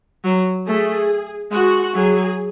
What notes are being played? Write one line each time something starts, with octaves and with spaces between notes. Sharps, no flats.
F#3
A3 G#4
G#3 F#4
F#3 G#4